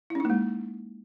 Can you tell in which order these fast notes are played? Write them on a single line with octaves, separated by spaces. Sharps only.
E4 C#4 D#4 A#3 G#3